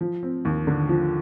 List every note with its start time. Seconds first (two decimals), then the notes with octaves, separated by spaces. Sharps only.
0.01 F3
0.23 C4
0.45 D#2
0.67 D3
0.89 F3